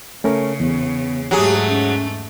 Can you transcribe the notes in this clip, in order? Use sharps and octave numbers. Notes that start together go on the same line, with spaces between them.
C#3 A3 C#4 A#4
E2 B3
G#2 F#3 A3 G4 G#4
C#4